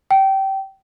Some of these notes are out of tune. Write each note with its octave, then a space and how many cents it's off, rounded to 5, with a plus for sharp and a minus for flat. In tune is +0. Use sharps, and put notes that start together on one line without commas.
G5 -20